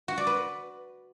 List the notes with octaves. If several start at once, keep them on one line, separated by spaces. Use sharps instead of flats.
F#4
D5
B4